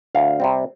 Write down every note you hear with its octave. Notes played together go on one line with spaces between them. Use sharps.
D2 F5
C3 G3 C4